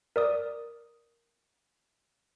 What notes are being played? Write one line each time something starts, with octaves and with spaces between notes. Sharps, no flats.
A#4 D5 D#6